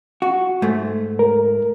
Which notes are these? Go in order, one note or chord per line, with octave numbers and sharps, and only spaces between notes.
F#4
G#2 A3
A#4